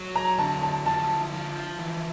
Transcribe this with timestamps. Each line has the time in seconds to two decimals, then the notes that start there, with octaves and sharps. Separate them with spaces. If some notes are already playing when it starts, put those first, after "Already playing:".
Already playing: F#3
0.16 A#5
0.38 D3 A5
0.63 A5
0.86 F3 A5
1.33 F3
1.79 E3